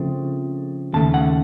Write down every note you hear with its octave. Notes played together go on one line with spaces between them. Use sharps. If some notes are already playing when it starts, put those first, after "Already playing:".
Already playing: C#3 F3 A3 C4
D#2 C#3 A3 A5
F#5